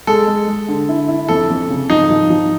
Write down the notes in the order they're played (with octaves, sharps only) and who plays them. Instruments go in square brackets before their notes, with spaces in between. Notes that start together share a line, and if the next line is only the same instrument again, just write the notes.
[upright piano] G#3 [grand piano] A4
[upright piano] G#3
G#3
D3
E4
E4
[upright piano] F2 [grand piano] A4
[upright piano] F2
C#3
[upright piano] F3 [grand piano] D#4
[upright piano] F3
F3